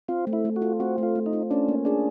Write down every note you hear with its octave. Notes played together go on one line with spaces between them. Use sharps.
C4 F4
A3
E4
A3
F#4
F4
C4 F#4
A3 F4
A3
D#4
F4
C#4 D4
A#3
D4 G#4